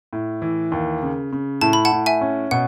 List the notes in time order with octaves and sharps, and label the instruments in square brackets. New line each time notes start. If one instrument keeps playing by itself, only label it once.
[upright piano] A2
E3
D#2
C#3
C#3
[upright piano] A2 [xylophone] A5
[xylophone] B5
F#5 A5
[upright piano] A2
[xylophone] E5 G#5
[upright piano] C#4
[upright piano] B2 [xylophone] F#5